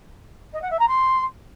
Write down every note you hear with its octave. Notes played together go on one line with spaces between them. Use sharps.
D#5
F#5
E5
A#5
C6